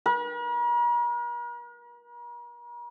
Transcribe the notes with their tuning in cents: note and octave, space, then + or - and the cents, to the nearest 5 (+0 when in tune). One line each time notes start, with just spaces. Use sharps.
A#4 +45